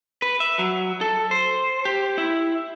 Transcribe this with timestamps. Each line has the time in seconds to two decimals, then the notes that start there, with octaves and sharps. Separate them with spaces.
0.22 B4
0.40 E5
0.59 F#3
1.01 A4
1.31 C5
1.85 G4
2.18 E4